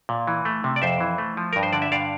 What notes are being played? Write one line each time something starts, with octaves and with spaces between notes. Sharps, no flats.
A#2
E3
A3
C3
D5
F2 C5 E5
E3
A3
F3
G2 A#4
C5
D3 D5
E5
G2 D5 F5